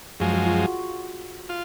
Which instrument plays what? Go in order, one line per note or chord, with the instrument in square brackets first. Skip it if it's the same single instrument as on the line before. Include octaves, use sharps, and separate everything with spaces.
[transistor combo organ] F#2 F3 G#3 [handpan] G#4
[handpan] F#4
F4
F#4
[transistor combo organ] F4